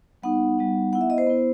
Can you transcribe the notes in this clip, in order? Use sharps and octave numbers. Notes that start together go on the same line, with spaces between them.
G3 B3 D#4 F#5
G3 B3 D#4
B3 E4 F#5
E5
D#5
C5
B3 E4